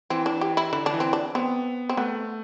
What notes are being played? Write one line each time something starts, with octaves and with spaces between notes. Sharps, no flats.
E3 C4
D4
G4
E4
D3 E4
D4
E3
C4
D4
B3 C4
C4
A3 B3